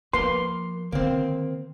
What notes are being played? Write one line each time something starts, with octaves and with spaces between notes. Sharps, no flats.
F3 A#3 B4 C6
D3 D#3 A#3 C4